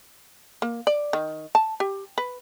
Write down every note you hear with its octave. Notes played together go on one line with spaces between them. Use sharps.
A#3
D5
D#3
A5
G4
B4